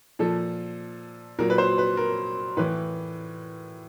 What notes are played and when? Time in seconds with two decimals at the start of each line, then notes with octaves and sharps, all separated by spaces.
0.19 A#2 F3 A4
1.39 A#2 F#3 A#4
1.50 B4
1.58 C5
1.78 B4
1.97 A#4
2.57 A2 E3 B4